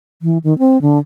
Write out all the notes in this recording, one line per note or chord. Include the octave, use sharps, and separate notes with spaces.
E3
D#3
C4
D3